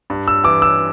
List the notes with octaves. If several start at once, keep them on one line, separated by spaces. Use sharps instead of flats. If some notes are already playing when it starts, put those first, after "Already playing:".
G2
E6
E3 D6
E6